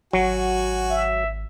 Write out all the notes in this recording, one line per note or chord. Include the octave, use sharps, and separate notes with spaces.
G#1 F#3 F#4 G#5
E5